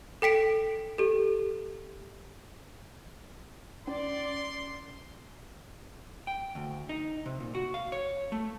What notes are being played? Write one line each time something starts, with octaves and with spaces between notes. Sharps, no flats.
A4 G5 B6 D7
G4 A4
C#4 D5 C6
G5
D2
D#4
C3
A#2
F#4
F5
C#5
A3